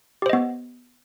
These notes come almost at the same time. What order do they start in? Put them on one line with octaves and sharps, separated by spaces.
G4 C5 D#5 B3